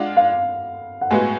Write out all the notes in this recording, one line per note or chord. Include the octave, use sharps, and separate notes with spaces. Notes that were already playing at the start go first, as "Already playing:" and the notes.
Already playing: G#3 D4 F4 F#5
F5
F#5
A2 G#3 B3 F#4 G#5